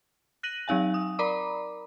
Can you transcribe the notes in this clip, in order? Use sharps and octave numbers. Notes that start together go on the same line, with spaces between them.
F#6 A#6 D#7 F#7
F#3 C4 D#4 F5 G#5
D#6
A#4 D5 A#5 B5 D6